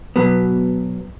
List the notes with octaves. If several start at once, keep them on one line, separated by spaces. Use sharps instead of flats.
B2 F#3 B3